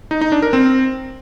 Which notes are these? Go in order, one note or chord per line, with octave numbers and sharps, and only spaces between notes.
D#4
D#4
D4
A#4
C4